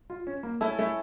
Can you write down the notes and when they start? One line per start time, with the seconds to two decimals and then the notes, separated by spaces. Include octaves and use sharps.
0.10 F4
0.27 C#4
0.43 A#3
0.61 A3 C#4 E4 A4
0.79 A3